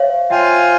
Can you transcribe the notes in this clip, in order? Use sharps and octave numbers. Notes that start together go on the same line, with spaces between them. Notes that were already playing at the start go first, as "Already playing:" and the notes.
Already playing: C5 C#5 E5 F5
F4 C5 E5 F5 G5 G#5